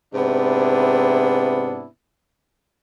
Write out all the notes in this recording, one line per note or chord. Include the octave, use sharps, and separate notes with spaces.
G#2 C3 B3 D4 E4